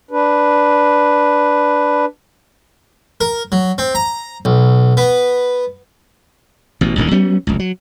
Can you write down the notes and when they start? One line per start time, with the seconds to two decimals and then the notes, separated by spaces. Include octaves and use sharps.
0.11 D4 B4
3.21 A#4
3.52 F#3
3.78 C4
3.95 A#5
4.45 B1
4.97 B3
6.81 A1 B2
6.98 D#1 C#2 A2 D#3
7.11 F#3 G3 B3 C#4
7.47 F1 C#2
7.59 F#3